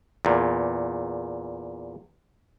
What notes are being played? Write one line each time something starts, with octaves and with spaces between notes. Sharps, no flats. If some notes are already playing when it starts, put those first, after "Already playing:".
E2 A#2